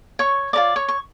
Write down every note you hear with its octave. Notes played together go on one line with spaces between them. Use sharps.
C#5 C#6
F4 A#4 C#5 D5 D6
C#5 C#6
C#6